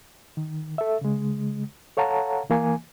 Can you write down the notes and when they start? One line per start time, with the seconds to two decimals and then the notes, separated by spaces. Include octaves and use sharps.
0.37 D#3
0.78 A4 E5
1.01 C#3 G#3
1.97 A4 C#5 F5 F#5 A5 A#5
2.50 E3 A#3 G#5